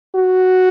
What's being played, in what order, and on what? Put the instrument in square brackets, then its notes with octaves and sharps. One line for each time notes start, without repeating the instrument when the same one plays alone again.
[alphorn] F#4